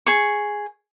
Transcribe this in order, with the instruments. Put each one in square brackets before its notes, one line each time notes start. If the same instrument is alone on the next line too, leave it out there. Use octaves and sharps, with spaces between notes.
[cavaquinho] G#4 C#6